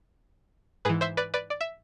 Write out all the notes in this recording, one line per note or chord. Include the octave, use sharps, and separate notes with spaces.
G#2 E3 G#4 B4
C5 E5
B4 D5
B4 D5
D5
E5